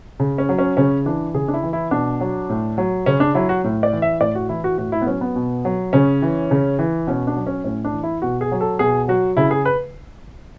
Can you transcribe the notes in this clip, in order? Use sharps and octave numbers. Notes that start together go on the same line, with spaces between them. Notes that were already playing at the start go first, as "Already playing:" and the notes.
C#3
C#4
F#3
C#4
C#3 C#4
E3 D4
C#3 G#4
D4
E4
E3
E4
B2 D4
F#3
A2
F#3
C#3 C#4
D4
F#3 E4
F#4
A2
D5
E3
E5
A2 D5
F#4
E3 E4
F#4
A2 F#4
E4
B3
F#3 C#4
B3
B2
F#3
C#3 C#4
E3
C#3
E3
B2 C#4
D4
F#3
C#4
A2 C#4
D4
E3
E4
B2 F#4
G#4
F#3
A4
B2 G#4
F#3 F#4
C#3 E4
G#4
B4